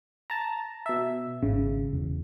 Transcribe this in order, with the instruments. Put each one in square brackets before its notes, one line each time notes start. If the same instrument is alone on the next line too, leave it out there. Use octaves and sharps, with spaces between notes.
[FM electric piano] A5 A#5
B2 E5
[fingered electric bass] G#1 C#4 [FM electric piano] C#3
[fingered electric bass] E1